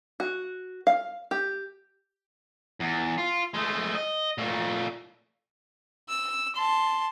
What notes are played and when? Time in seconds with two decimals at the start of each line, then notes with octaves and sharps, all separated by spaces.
0.20 F#4
0.87 F5
1.31 G4
2.80 E2
3.18 F4
3.54 G#3 A3
3.95 D#5
4.38 A#2 A3
6.09 E6
6.55 A5 C6